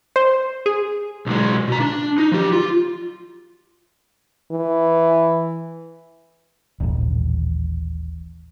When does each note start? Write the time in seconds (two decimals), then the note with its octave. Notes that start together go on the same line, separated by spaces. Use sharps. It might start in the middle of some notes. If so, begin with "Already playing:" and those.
0.16 C5
0.66 G#4
1.26 B1 G#3
1.68 B2 A#5
1.80 D4
2.18 D#4
2.32 F3 G4
2.52 F4
4.52 E3
6.80 D#1 A1